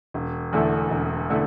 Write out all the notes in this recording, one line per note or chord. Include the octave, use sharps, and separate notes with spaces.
E1
E2 D3 A3 E4
E1
D3 A3 E4